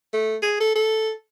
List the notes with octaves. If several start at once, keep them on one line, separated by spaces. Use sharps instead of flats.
A3
G#4
A4
A4